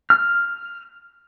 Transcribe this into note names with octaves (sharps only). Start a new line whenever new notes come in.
F6